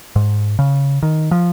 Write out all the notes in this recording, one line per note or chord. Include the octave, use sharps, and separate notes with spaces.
G#2
C#3
D#3
F3